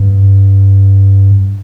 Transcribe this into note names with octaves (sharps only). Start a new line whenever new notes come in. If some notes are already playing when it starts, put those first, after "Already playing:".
Already playing: G2